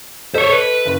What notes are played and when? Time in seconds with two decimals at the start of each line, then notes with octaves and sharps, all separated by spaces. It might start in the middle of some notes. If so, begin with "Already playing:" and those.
0.34 A4 C5 C#5 D#5 B6
0.52 B4
0.85 F#1